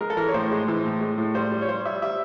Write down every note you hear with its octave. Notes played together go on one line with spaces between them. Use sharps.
G#3 A#4
A4
E3 A#4
C#5
A2 C5
G#3
E3
A2
G#3
A2
G3 C5
G3
C#5
G3 C5
G3 E5
G3 E5